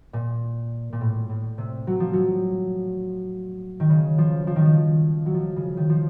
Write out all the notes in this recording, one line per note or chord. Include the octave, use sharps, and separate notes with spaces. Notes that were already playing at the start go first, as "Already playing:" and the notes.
A#2
A#2
A2
A2
C3
F#3
F3
F#3
D#3
C#3
F3
F3
D#3
F3
F#3
F3
C#3
D#3
F3